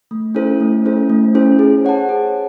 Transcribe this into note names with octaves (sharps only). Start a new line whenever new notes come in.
A3
C#4 E4 A4 C5
A3
C#4 E4 A4 C5
A3
C#4 E4 A4 C5
G#4
C#5 F#5 A5
G#4